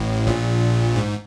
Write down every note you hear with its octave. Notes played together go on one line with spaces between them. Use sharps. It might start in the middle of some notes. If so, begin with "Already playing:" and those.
Already playing: A1 A2
A#1 A#2
G#2